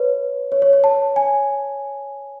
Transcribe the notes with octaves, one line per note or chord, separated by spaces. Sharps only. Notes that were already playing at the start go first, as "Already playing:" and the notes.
Already playing: B4 C#5
C#5
C#5
C#5
A5
G#5